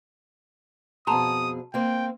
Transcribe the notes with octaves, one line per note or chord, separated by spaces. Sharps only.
F2 B2 G#4 A5 A#5 C6 D#6
A#3 C4 G5